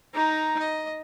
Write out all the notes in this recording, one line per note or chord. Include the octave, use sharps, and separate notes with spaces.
D#4 A#5
D#5